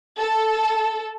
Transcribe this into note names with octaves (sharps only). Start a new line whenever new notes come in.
A4